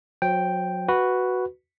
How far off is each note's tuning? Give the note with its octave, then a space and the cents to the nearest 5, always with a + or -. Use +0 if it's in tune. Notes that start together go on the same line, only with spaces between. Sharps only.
F#3 -25 C5 -5 G5 +0
F#4 +0 B4 +0